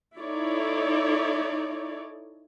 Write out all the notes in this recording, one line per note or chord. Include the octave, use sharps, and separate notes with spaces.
D#4 E4 A4 C#5 D5